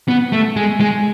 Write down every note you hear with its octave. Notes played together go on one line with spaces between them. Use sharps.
B3
A3
G#3
G#3